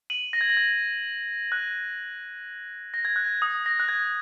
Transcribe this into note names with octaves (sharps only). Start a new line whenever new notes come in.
D#7 F#7
A#6
G#6
A#6
G#6
F#6
A#6
G#6
F#6
G#6
D#6
A#6
F#6
G#6